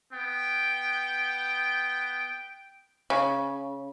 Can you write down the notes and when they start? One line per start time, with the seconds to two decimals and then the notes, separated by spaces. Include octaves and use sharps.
0.13 B3 G5
3.10 C#3